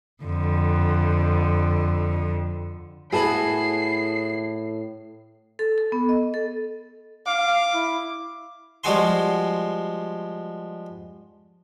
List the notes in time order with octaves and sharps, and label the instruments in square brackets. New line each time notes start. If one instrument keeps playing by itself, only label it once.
[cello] F2 D3
[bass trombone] A2 [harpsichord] B3 E4 F#4 [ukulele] G#4 A4 [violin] C7
[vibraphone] A4
A4
B3
D#5
A4
[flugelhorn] F5 [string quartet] D6
[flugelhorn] E4
[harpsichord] F3 G3 G#3 F#4 G#5 C6